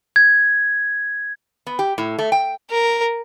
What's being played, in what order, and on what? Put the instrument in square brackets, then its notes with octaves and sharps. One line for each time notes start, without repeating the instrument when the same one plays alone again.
[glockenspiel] G#6
[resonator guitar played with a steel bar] B3
G4
A2
A3
G5
[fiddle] A#4